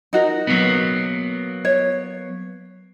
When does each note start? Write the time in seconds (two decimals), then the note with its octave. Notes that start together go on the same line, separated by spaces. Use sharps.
0.13 D#4 F#4 A#4
0.47 F#3 A#3 B3
1.65 C#5